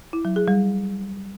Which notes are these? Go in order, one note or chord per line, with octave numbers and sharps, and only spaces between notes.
E4
F#3
G#4
G3